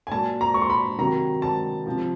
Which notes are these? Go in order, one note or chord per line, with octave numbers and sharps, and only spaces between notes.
G#5
A#2 F#3 A5
A#5
C#6
C6
B5
C3 D#3 F#3 A#5
A5
C3 F3